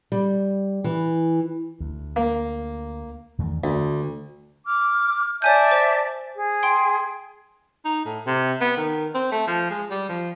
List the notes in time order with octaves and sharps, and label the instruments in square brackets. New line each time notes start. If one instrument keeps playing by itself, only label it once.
[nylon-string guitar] G3
E3
[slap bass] D2
[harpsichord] A#3
[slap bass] E2 D#3 A3
[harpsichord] D2 [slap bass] D3
[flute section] D6 F6
[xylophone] C#5 G#5 G6 [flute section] D5 E5 A5
[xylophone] C5
[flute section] G#4
[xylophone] G5 C6 D7
[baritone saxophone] D#4
A2
C3
B3
D#3
C4
A3
F3
G#3
G3
F3